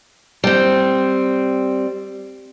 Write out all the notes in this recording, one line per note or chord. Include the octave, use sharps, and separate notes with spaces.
G3 C4